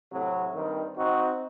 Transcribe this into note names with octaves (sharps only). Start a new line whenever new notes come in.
A2 C3 F#3
G2 D#3 G3 C4
C4 D#4 F#4